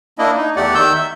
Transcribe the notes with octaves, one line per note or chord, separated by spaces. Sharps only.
A#3 D4 E4 D#5
D#4
E2 A3 G4 D5 F#5
D#3 E6 G6
E5